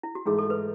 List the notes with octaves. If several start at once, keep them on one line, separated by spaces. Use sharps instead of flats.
E4
F#4
G#2 E3 A3 G#4
A4
B4